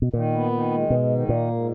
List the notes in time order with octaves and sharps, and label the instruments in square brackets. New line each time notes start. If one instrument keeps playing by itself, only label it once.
[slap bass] B2
[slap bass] A#2 [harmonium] D#3
[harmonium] B3
D#3
G#3
[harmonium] G#2 [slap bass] B2
[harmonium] D#3
[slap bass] A#2 [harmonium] A#3
[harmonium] G#2